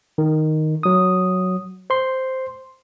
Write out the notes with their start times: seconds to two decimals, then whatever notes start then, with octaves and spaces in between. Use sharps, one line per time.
0.18 D#3
0.83 F#3 D#6
1.90 C5 C6